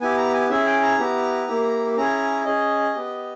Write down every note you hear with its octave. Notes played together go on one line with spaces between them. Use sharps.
B3 E4 G4 G#5
A#5
G#5
C#4 E4 G#4 E5
G5
A#5
B3 E4 G4
A#3 E4 G4
C#4 E4 G#4 A#5
C#4 G#4 D#5
B3 G4